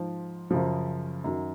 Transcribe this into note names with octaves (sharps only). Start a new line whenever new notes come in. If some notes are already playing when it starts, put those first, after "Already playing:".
Already playing: G#2 F3
F#2 C#3 F3
F#2 D#3 F#3